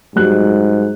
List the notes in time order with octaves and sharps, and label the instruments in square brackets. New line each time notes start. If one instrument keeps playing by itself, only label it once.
[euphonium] G#2 [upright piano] F#3 G3 F#6